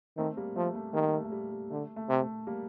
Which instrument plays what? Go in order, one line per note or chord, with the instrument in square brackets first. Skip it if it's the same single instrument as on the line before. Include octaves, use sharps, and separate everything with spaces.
[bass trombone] D#3 [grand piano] A3 C4
[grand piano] G3 A#3
[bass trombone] F3 [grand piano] A3
[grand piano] A3
[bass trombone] D#3 [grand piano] G3 A#3
[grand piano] A3
A3
G3
G3
[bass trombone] D3 [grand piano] A3
[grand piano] A3
[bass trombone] C3
[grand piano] A3
G3 A#3